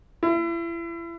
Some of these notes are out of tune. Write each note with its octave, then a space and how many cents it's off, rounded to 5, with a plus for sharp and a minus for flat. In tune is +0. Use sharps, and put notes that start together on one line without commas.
E4 +35